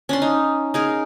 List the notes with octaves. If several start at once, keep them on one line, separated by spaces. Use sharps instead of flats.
C#4 D4 C6
D#4
D#4 G#4 A#4